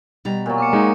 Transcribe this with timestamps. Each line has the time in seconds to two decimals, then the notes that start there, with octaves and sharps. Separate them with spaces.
0.25 B2 G3 A#5
0.46 A#2 F#3
0.58 C#6 D6 C#7
0.73 G#3 D#4